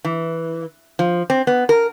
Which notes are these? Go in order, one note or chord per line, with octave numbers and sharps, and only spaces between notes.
E3
F3
C4
B3
A#4